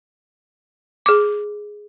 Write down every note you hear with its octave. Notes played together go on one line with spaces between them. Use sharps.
G#4 D6